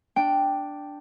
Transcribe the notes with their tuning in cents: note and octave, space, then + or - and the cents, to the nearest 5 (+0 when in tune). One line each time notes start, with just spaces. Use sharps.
D4 +0 G5 +0